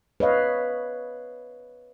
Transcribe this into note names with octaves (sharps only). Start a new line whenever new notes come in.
B4 C#5 D#5 F5